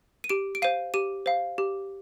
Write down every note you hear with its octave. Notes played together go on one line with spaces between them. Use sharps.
D#7
G4 D7
D7
C5 F5 D#7
G4 D#7
C5 F5
G4